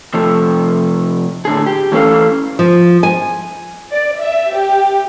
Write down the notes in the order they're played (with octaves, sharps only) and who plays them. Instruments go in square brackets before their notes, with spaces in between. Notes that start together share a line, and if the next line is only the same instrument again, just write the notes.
[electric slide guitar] C3 F3 A3
A2 D3 G#4
G4
E3 A3 C#4 A4 F5
[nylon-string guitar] F3
G#5
[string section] D5
E5
G4